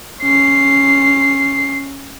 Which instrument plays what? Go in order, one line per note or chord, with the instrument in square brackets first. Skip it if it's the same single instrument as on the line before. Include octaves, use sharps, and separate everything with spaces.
[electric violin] C#4 C7